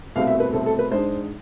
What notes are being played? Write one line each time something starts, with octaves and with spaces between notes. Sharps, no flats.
C2 B2 A3 C4 F5
E5
B4
C2 B2 A3 C4 A4
A4
B4
G#2 G#3 D4 C5